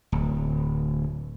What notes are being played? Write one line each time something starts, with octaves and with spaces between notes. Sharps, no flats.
D1